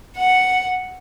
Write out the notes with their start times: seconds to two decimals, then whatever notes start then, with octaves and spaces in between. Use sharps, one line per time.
0.17 F#5